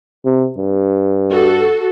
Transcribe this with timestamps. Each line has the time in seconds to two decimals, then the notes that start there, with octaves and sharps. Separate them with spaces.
0.25 C3
0.57 G2
1.32 F#4 A4